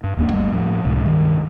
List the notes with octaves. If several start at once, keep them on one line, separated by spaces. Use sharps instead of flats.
G2
D1 D#2 A#3 D4
G1 G3 A3
A2 F3
C#2 A2 C3
G2 D#3